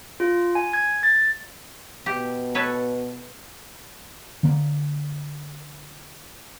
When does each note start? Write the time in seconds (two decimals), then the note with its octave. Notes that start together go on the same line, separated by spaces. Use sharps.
0.20 F4
0.55 G#5
0.73 G#6
1.03 A6
2.06 B2 G4
2.55 A4 B4 C#5
4.43 D3 A#3